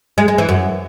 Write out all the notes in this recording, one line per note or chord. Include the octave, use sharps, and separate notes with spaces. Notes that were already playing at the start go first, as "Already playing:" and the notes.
G#3
G#3
E3
F#2